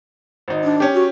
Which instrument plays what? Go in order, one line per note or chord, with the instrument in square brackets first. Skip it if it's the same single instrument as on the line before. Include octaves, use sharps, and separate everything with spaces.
[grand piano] G#1 D#4
[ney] D4
[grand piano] C#4 G4
[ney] F#4